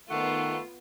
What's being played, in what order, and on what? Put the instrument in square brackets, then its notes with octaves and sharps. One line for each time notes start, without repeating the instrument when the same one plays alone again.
[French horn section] D#3 [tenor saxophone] A3 [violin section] B3 F4 [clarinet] F#5